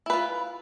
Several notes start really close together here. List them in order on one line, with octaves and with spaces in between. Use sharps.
E4 B4 F4